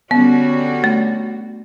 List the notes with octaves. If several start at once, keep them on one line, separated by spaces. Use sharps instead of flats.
D3 G3 B3 C#4 F#4
A3